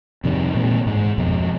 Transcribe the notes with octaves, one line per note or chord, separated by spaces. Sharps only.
F2 C3 D#3 G3
A#2 E3 G#3 C4
G#2
F2 B2